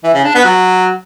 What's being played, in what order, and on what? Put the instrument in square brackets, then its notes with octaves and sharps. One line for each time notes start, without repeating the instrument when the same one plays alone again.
[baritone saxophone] E3
C#3
D4
B3
F#3